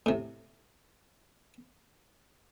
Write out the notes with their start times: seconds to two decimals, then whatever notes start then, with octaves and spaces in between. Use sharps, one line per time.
0.06 A2 C3